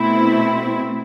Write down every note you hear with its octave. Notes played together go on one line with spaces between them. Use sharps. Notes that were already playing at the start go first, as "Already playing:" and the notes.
Already playing: B2 A3 C4 E4